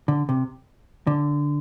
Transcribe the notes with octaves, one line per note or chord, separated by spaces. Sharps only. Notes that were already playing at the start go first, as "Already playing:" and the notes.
D3
C3
D3